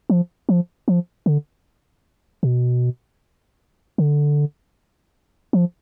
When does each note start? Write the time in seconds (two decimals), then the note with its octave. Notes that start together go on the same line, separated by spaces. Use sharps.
0.10 F3
0.49 F3
0.88 F3
1.26 D3
2.43 B2
3.98 D3
5.53 F3